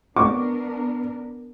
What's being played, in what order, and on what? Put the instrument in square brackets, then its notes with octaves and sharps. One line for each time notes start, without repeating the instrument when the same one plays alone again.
[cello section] B3 D4 A#4 [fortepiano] C#6 D6